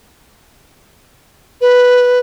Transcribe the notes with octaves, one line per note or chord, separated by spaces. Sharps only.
B4